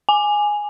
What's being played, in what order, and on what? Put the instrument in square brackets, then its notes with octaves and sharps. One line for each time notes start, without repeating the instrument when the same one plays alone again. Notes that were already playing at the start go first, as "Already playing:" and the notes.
[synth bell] G#5